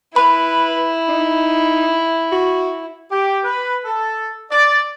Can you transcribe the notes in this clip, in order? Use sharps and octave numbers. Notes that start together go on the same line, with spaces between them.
E4 B4 B5
D#4
F#4
G4
B4
A4
D5